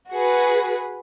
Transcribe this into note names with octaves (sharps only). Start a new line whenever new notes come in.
F#4 G#4 B4